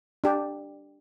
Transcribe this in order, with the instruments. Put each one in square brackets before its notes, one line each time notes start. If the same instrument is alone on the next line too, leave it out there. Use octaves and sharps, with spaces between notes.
[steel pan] D4 G4